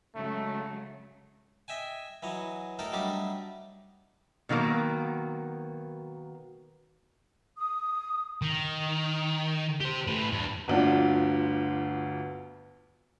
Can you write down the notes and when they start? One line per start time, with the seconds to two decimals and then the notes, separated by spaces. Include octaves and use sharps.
0.15 C#3 F#3 G#3 A3
1.68 D#5 E5 G5 G#5
2.23 E3 F#3 C#5 D#5
2.79 A3 D#4 A4 A#4 G5
2.93 F#3 G3 A3 D4 D#4 G4
4.49 B2 D#3 F#3 A#3 B3
7.58 D#6
8.42 D#3
9.80 G4 C5
10.07 A2 B4
10.31 E2 G2
10.68 G1 D2 D4 F4